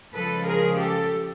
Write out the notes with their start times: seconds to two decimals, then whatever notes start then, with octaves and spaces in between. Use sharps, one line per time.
0.13 C#3 F3 G#3 A4 B4
0.46 G#4 A#4
0.77 G4 A4